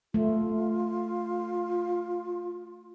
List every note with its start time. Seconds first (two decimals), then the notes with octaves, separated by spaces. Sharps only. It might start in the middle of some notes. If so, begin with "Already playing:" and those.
0.14 A3 F4